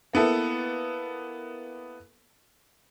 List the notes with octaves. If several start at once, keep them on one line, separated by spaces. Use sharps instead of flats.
A#3 B3 E4 A4